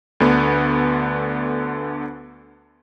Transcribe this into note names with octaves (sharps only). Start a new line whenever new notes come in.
D2 D3 B3